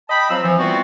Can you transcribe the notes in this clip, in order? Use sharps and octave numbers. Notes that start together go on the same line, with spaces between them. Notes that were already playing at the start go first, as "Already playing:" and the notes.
D#5 G5 A5 B5
F3 F#3 C4 F5 E6
E3 F3
E3 G3 B3 C4 F4 F#4